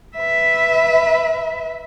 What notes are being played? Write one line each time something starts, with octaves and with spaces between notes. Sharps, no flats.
B4 E5